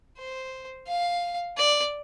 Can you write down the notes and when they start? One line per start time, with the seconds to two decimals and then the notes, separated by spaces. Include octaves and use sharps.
0.18 C5
0.88 F5
1.58 D5